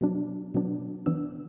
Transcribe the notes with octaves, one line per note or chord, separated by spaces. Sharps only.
B2 F#3 D4
B2 F#3 B3 D4
E3 B3 D4 E6